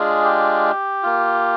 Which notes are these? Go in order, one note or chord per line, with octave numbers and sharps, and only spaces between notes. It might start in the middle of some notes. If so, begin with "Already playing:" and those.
Already playing: G#3 D4 F4 G#4
G4
A#3 F4